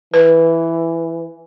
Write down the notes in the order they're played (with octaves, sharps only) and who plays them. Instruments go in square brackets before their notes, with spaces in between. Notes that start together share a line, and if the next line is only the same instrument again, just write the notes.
[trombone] E3 [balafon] B4